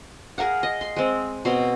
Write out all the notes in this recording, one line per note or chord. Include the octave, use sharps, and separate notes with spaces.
G#4 A#4 F5 F#5
D#5
C6
G#3 C4
B2 C4 C#5 C6